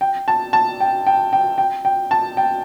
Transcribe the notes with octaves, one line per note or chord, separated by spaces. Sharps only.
G5
A5
A5
G5
G5
G5
G5
G5
A5
G5